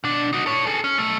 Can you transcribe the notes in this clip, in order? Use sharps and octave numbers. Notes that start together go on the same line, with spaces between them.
B2 D4
D#4 F#4
A4 C#5
G#4 A4
C#4
B1 A3